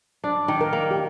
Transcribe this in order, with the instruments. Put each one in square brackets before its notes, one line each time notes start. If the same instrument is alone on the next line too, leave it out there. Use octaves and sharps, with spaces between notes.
[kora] D4 [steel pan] D5
[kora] D#3
[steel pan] A#4
[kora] A#3
[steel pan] G4